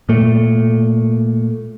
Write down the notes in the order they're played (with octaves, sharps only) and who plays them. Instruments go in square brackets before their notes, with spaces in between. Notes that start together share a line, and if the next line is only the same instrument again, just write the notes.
[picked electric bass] A#2 A3